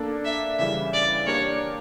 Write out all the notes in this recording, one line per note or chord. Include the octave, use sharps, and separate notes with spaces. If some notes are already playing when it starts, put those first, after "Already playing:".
Already playing: A#3 D4 A4 D5
E5
C#3 E3 G3 E5
D5
A#3 D4 G4 A#4 C#5 D5